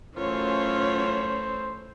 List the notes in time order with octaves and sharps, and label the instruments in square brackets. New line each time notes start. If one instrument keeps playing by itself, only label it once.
[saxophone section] F#2 F4 [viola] E3 A3 [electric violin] C#4 C#5 [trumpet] C5